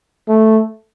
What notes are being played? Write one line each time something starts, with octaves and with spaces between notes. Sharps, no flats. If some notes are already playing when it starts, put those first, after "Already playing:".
A3